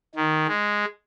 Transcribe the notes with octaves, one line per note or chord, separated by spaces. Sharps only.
D#3
G#3